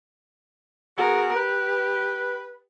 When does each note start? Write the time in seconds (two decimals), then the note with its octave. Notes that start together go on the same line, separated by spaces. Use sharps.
0.98 B3 F#4 G#4 A#4
1.36 G4 B4